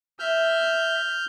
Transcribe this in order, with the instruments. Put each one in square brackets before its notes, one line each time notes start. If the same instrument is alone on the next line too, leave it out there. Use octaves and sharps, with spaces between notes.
[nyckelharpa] E5 [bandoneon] F6 G6